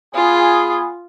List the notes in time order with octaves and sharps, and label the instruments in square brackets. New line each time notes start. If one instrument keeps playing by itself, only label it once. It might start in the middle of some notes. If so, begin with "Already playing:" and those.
[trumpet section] B3 G#4 [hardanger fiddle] F4